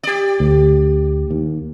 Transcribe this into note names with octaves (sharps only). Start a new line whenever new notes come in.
G4 D5
D2
D#2